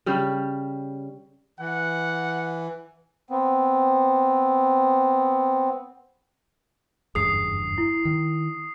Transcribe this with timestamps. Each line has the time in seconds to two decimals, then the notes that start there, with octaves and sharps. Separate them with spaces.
0.06 C#3 G3
1.59 E3 F#5
3.30 B3 C4
7.15 F#1 E2 G2 G#4 D#6 C7
7.78 E4
8.05 D#3